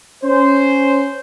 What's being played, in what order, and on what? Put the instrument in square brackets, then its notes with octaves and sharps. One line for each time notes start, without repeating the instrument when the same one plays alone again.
[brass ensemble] C#4 C5